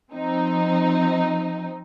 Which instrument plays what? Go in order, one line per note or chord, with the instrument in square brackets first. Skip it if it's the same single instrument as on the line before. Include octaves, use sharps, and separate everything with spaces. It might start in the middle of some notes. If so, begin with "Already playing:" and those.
[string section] F3 C4 D#4